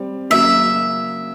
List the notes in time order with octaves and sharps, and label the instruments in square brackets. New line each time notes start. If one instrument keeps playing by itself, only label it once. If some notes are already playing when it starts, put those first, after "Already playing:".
Already playing: [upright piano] G3 C4
[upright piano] C#3 F#3 A#3 [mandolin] E5